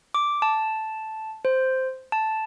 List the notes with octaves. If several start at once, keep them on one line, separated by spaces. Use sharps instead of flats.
D6
A5
C5
A5